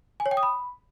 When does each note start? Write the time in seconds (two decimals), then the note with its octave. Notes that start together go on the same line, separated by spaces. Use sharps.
0.20 G#5
0.26 C#5
0.31 G5
0.37 D#6
0.43 B5